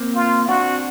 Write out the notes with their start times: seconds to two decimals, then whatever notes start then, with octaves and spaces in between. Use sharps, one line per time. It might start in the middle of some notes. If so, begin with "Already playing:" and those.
Already playing: A#3 C4
0.15 F4
0.48 C4 D4 F#4